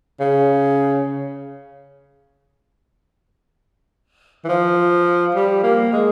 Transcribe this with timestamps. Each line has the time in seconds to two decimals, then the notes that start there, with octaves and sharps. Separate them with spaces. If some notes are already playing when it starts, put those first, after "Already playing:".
0.20 C#3
4.44 E3
4.49 F3
5.35 G3
5.63 A#3
5.93 G#3